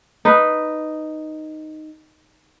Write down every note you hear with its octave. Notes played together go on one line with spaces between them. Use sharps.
D#4 B4